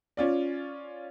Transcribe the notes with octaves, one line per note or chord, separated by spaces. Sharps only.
C#4 F4 D5